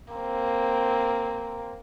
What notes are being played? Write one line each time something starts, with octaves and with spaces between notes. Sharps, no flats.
A#3 C4